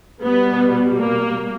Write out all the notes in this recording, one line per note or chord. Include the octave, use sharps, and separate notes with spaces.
B2 G3 B3
A#3